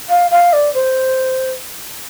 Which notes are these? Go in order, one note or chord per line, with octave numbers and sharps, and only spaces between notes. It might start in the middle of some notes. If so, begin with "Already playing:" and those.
F5
F5
D5
C5